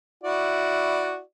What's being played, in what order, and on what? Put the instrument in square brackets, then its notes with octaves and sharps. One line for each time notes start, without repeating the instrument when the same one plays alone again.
[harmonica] E4 F#4 D5